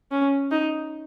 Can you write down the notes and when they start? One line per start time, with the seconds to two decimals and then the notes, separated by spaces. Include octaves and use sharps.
0.12 C#4
0.51 D#4